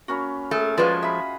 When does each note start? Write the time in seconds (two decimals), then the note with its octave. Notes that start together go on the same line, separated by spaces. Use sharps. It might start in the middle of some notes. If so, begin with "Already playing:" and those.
0.08 A#3 C#4 F#4 B5
0.51 A3 G#4 A#4
0.78 F3 G#3 F4 F#4 B4 D5 F5
1.03 D#5 E5 B5